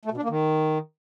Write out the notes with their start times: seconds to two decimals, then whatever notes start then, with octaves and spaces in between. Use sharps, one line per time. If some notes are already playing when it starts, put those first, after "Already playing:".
0.05 A3
0.11 B2
0.17 D4
0.23 A#3
0.29 D#3